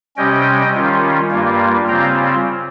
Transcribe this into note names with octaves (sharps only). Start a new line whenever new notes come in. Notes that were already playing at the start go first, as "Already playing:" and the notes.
C3 G3 C#4 D#5 G5
D#3 G3 C#4 F4
G2 G3 A#3 F4
C#3 G3 C4 F4 G5 A#5